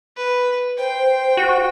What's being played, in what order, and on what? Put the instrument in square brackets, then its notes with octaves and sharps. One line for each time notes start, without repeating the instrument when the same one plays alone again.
[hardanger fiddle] B4
[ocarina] C5 [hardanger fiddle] G5
[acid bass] F#4